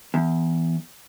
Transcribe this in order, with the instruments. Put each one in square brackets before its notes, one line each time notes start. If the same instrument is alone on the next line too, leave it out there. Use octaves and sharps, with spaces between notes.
[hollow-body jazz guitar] E2